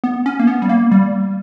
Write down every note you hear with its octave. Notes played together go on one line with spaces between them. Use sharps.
B3
C#4
A#3
B3
G3
A#3
G3